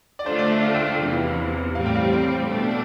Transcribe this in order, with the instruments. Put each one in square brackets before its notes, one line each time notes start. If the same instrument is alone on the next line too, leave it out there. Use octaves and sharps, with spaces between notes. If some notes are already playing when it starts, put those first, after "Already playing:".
[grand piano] D5
[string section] D3 A3 D4 F4 [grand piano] C5
[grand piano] D5
E5
F5
G5
F5
[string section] E2 C3 E3
[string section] A2 G3 C4 [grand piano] F5
[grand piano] G5
F5
G5
[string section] B2 A3 D4